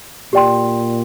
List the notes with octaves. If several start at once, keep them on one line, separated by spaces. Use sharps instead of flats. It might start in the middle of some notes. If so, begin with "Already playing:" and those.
A#2 G4 D5 G5 C6